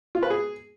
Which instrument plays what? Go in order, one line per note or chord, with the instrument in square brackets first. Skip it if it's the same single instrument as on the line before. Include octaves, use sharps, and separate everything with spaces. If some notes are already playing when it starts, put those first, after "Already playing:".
[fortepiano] F4
B4
G#4